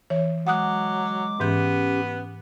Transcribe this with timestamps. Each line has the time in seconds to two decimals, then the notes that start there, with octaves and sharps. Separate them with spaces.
0.10 E3 C#5
0.47 F#3 G#3 F#5 D6 D#6 F#6
1.40 G#2 E3 B3 C#4 G4 G6